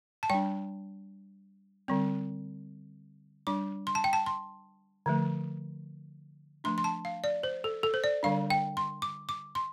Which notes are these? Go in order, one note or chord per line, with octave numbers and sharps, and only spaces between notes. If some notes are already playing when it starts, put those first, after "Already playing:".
A5
G3 D4 G5
D3 G3 C4
G3 D4 D6
C6
A5
G5
A5
C6
D3 F3 A3
F3 A3 D4 C6
C6
A5
F5
D5
C5
A4
A4
C5
D5
D3 G3 D4 F5
G5
C6
D6
D6
C6